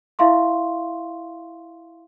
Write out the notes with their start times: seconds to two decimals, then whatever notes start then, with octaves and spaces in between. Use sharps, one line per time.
0.19 E4 E5 F5 C6 C#6